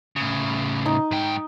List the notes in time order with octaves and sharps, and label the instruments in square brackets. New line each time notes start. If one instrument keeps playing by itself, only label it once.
[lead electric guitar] A2 C#3
[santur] D#4
[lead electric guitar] G#2 G5